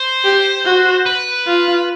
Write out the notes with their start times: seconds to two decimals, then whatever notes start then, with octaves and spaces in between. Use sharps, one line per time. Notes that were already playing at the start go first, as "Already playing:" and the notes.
Already playing: C5
0.24 G4
0.65 F#4
1.06 B4
1.47 F4